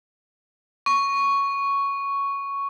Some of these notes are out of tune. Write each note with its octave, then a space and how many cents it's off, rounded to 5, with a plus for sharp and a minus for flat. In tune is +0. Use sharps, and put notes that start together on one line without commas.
C#6 +5